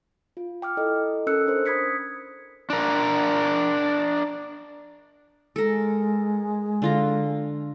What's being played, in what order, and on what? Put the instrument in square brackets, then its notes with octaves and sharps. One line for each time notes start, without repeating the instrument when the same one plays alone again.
[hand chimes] F4
G5 D6 F6
E4 A4 D#5
C#4 A4 A#4 E6 F#6 C#7
D4 A#4 C5
B5 D#6 G#6 B6 C#7
[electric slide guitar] D4 A#4
[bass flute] G#3 [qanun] A4 A#4
[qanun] D3 F4 A#5